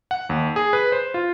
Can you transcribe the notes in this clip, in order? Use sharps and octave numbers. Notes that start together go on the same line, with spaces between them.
F#5
D#2
G#4
B4
C5
F4